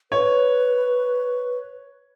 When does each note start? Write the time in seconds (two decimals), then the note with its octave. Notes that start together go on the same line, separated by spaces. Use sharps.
0.11 B4 C#5